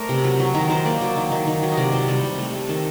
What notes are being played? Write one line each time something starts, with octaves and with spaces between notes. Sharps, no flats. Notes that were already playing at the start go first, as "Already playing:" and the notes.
Already playing: A3 A#4 C5 D5
C3
F#3
F#3
D#3 A#4
D#3 C5
A#3 D5
F#3
D#3
D#3
D#3
F#3
D#5
C3 D5
C3 C5
G3 A4
C3
A3
A3
D#3 A4